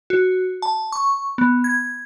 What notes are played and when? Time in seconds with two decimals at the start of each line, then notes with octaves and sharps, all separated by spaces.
0.10 F#4
0.62 A5
0.92 C#6
1.38 B3
1.64 G#6